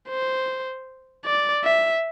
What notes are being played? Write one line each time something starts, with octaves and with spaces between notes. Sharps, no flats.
C5
D5
E5